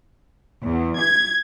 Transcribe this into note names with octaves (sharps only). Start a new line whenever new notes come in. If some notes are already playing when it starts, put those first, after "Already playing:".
E2
G#6